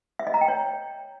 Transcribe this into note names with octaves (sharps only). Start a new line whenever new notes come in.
E5
D#5
A#5
G5
C#5